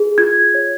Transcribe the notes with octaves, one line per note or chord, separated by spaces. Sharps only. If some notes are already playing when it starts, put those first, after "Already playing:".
Already playing: G#4
F4 G#6
C#5